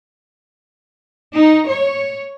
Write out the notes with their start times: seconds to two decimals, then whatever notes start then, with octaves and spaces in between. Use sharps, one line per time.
1.35 D#4
1.68 C#5